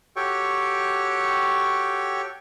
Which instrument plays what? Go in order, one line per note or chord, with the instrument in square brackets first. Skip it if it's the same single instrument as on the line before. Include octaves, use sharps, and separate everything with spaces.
[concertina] F#4 G4 A4 C#5 G5 C#6